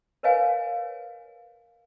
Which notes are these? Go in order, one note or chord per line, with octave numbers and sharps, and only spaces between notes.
A#4 B4 C#5 D#5 F5 G#5